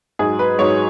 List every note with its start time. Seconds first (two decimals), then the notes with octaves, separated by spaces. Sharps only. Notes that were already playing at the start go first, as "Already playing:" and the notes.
0.19 G#2 F#3 G#4
0.39 B4
0.58 G#2 F#3 C#5